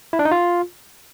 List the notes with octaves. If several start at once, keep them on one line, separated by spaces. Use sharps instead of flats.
E4
D4
D#4
F4